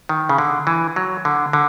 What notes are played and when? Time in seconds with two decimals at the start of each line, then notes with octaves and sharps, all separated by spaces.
0.09 D#3
0.29 C#3
0.38 D3
0.67 E3
0.96 F#3
1.25 D3
1.53 D3